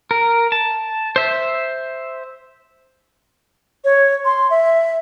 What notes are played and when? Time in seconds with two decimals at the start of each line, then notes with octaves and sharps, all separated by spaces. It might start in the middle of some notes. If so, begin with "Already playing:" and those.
0.11 A#4
0.52 A5
1.16 C5 E5
3.85 C#5
4.25 C6
4.50 E5